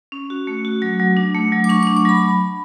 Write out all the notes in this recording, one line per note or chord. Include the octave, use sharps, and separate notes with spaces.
C#4
F#4
A3
F#4
F#3
F#3
D4
A3
F#3
D6
D4 C#6
D6
D4
D6
F#3 B5